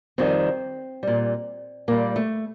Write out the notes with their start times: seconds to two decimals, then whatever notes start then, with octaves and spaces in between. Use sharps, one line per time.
0.18 F2 D#3 G3 C4
1.03 A#2 G3
1.88 A#2 G3 A#3
2.16 A3